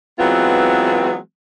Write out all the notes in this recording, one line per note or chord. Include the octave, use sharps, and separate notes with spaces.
E3 F#3 G#3 B3 C4 F4